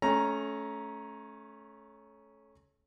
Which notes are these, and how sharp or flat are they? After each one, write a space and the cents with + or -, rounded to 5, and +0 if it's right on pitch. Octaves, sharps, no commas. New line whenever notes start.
A3 -25 C#4 +0 A#5 +10